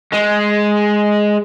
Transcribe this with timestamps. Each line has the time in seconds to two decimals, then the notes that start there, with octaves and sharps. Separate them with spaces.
0.12 G#3